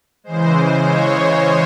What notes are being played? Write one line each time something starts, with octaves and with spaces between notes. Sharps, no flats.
C#3 E3 G#3 C5
C#5